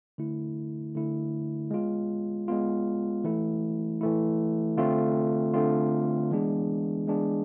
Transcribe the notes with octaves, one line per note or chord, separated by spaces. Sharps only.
D3 A3 E4
D3 A3 E4
G#3 B3 F4
G#3 B3 F4
E3 A3 E4
E3 A3 E4
D3 A3 C4 F4
D3 A3 C4 F4
E3 G#3 B3 D4 G#4
E3 G#3 B3 D4 G#4